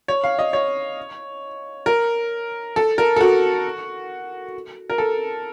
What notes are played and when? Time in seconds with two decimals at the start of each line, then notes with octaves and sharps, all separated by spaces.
0.08 C#5
0.24 F5
0.39 D#5
0.53 C#5
1.86 A#4
2.76 A4
2.98 A#4
3.16 A4
3.21 F#4
4.90 A#4
4.98 A4